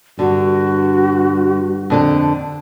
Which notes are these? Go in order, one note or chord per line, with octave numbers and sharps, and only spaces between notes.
G2 D3 F#4
F2 D3 A4